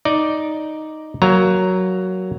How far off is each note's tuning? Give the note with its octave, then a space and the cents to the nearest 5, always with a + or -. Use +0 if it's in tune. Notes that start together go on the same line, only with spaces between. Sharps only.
D#4 +0 D5 +0
F#3 +5 A#3 +0 A#5 +0